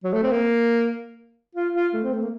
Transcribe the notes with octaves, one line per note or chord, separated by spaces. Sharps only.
F#3
A3
C4
A#3
F4
F4
A3
C4
A3
A#3